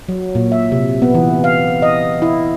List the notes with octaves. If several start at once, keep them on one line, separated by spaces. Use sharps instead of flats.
F#3
A#2
E5
C3
B3
E3
F5
D#5
E4